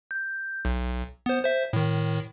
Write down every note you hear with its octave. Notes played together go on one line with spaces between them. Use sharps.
G6
B1
B3 C5
C5 E5
A2 D#3